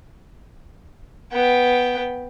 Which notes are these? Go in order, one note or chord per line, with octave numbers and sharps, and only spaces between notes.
B3 G5